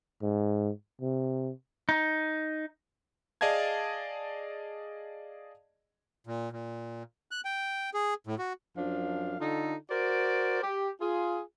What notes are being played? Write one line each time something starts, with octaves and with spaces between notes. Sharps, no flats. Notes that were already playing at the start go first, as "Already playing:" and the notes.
G#2
C3
D#4
G#4 D5 D#5 F5 A5 G#6
A#2
A#2
F#6
G5
G#4
A2
F#4
F#2 F3 D4 F5
D3 D#4 F4 A4
F#4 A#4 C5 D5
G4
F4 G#4